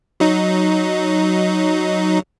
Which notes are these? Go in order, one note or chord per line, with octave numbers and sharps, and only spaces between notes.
F#3 D#4